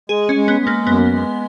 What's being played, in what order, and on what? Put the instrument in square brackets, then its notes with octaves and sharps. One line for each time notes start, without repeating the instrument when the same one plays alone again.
[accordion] G#3 [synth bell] G#4
[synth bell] C#4
[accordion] G#3
[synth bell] B3
[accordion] G#3
[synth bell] A#3
[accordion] F#2 [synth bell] B3
[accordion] G#3